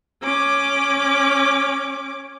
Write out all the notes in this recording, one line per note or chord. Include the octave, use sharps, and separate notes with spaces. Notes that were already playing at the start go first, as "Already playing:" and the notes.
C#4 D6